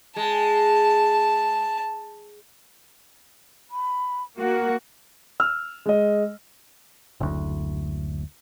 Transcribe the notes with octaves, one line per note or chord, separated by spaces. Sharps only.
G#3 A5
B5
A#3 F#4 A#4
E6 F6
G#3 D#5
F#1 D2